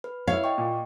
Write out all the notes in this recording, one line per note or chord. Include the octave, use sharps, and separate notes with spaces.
B4
E4 C#5 F5
D#5 G5 C#6
A#2